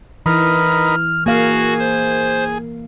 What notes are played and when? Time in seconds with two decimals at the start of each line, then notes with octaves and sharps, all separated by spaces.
0.26 E3 D#4 A#4 B4 F6
1.26 A#3 F#4 G#4 F5
1.79 C5